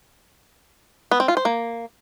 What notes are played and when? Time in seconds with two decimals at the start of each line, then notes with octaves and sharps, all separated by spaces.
1.11 B3
1.20 C4
1.28 F4
1.37 C5
1.45 A#3